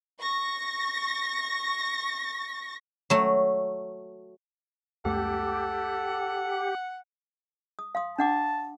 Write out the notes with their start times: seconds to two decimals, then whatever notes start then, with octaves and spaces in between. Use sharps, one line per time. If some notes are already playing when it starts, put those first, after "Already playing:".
0.20 C#6 A#6
3.10 F#3 A3
5.05 C#2 F#2 A3 G4 A4 F#5
7.79 D#6
7.95 F5 C6 D#6
8.19 D4 F#5 A5 D6